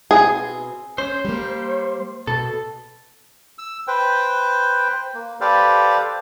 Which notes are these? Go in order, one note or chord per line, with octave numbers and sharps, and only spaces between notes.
B2 C4 G#4
C#4 C5
G3 A#3
B2 A4
E6
B4 C5 G5
A#3
G4 A4 B4 C5 D5 F5